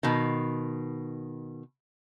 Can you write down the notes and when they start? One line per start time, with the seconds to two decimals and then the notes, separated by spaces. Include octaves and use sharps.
0.03 B2 D#3